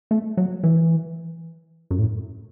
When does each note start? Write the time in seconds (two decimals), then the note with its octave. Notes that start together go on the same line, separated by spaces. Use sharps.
0.11 A3
0.37 F#3
0.63 E3
1.91 F#2
1.99 A2